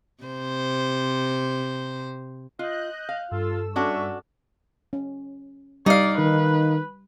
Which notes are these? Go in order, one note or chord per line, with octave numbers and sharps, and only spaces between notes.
C3 C5
F4 D#5 F#6 G6
F5
G2 F4 A4 E6
C#4 D4 F#4 D5 E5 C#6
C#4
G3 D#4 D5 F5
D#3 B4